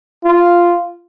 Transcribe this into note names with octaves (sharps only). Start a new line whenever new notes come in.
F4